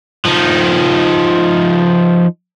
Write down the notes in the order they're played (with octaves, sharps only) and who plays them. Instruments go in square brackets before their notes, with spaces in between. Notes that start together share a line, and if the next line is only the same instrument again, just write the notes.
[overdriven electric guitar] F3 D#4